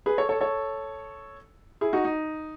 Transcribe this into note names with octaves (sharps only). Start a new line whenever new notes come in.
G#4 B4
A4 C#5
A4 C#5
A4 C#5
E4 G#4
D#4 F#4
D#4